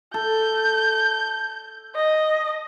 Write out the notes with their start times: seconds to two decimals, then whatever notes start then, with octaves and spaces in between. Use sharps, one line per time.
0.14 A4 G6
1.96 D#5